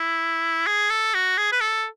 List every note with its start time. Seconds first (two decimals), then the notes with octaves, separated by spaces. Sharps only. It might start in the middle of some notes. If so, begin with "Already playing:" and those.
Already playing: E4
0.67 G#4
0.90 A4
1.14 F#4
1.38 G#4
1.52 B4
1.61 A4